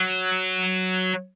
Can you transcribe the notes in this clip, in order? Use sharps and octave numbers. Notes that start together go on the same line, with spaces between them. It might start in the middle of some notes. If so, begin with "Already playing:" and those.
Already playing: F#3